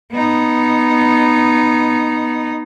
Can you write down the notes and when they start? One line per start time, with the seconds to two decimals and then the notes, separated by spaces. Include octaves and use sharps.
0.11 B3 D#4